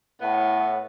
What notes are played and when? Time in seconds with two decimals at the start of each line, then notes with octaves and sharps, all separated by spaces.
0.22 A2 B3